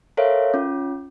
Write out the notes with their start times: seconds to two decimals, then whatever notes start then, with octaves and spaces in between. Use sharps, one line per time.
0.17 A4 A#4 C5 C#5 E5 F5
0.54 C#4 F4